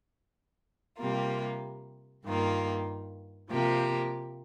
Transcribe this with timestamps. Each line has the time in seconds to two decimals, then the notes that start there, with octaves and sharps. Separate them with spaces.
0.98 C3 G3 A#3 F4
2.25 G2 D#3 A#3 F4
3.50 C3 F3 A#3 G4